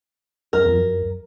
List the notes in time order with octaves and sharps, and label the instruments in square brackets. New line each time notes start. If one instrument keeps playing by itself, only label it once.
[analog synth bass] F#2 [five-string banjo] A#4
[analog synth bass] F2
F#2